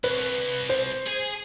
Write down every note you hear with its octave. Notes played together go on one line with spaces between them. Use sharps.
C2 B4
C5
G#4 G#5